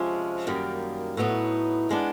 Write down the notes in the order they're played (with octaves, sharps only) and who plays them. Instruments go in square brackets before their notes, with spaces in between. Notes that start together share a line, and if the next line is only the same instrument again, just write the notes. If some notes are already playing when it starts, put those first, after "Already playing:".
Already playing: [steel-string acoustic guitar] C3 F3 G#3 C#4
F#2 D#3 G3 A#3
A2 F#3 B3 D#4
D#3 G#3 B3 D4